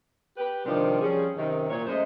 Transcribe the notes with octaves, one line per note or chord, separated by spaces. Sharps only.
G4 B4
C3 D#3 F3 G3 D4
F3 G3 C#4 G#4
F#2 C3 D#3
A#2 C#5
F#2 G#3 A3 C5 D#5